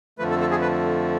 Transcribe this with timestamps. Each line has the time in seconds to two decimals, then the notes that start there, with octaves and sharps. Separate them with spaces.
0.19 F2 D3 F3 A3 B4
0.30 A4
0.41 A4
0.51 G#4
0.61 B4